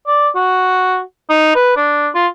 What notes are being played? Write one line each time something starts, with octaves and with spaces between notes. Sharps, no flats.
D5
F#4
D#4
B4
D4
F4